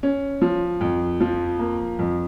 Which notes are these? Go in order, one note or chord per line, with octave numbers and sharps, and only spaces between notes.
C#4
F3
F2
F3
A#3
F2